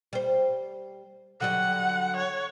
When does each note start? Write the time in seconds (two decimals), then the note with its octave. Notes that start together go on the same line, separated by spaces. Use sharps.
0.13 G3 C5
1.40 D3 F#3 G3 F#5
2.17 C#5